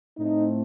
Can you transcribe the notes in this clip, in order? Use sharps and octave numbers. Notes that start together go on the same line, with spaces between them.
A2 A3 C4 D#4